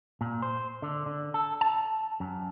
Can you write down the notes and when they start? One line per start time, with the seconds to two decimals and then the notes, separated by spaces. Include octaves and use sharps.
0.21 A#2
0.42 C5
0.82 D3
1.06 D3
1.34 A4
1.61 A5
2.20 F#2